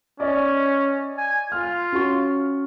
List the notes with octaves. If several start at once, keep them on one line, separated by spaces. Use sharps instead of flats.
C#4 D5 D#5
G#5
F4 F6
C#4 F#4 C#6